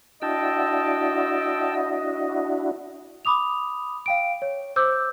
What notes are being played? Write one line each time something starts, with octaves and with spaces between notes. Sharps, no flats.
D4 E4 F#4 D#5 G5 A5 E6
B5 D6 D#6 F7
F5 G5 D7
C#5
C5 D6 E6 G6